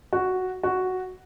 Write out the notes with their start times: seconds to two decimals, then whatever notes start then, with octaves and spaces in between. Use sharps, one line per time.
0.13 F#4
0.63 F#4